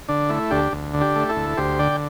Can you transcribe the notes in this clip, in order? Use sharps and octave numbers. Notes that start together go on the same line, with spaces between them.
D3 D4
A3 E4
D2 D4 G4
D2
D3
D4 G4
A3
E4 A4
D2
D2 G4 C5
D3 D5 G5